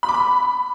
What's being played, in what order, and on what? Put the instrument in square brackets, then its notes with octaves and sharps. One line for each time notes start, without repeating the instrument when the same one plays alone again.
[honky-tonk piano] B5
D6
B5